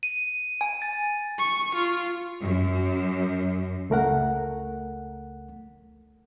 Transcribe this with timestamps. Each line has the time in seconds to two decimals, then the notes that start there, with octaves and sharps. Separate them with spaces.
0.03 D#7
0.61 G#5
0.82 A6
1.38 C#6
1.75 F4
2.41 F#2
3.90 C#2 A3 A#4 F#5